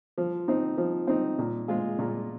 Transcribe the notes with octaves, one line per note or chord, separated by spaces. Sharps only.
F3
C4 D#4
F3
C4 D#4
A#2
G#3 F4 G#4
A#2